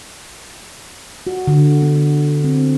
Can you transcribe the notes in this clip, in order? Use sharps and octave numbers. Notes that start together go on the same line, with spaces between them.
F#4
D3
B3
C4